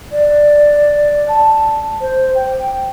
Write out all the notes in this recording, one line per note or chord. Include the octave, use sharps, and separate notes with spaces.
D5
A5
C5
G5